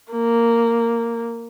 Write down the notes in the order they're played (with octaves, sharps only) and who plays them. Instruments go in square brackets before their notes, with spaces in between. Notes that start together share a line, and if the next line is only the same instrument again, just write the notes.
[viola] A#3